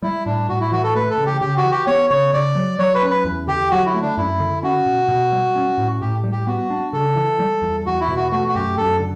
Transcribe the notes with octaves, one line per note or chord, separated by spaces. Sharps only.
G3 E4
A2 D4
A2 F#4
E4
E3 F#4
A4
A3 B4
A4
C#3
G4
C#3 G4
F#4
E3
G4
B3 C#5
C#3 C#5
C#3 D5
F#3
F#3 C#5
B4
C#4
B4
E2
D3 G4
F#3 F#4
E4
A3
D4
F#2 E4
D3
C#4 F#4
B2
B2
G3
C#4
A2
A2 G4
G3
G4
B3 F#4
D4
C#3 A4
E3
G3
E2
E2 F#4
E4
B2
F#4
A3 F#4
F#4
F#2 G4
F#2 A4
D3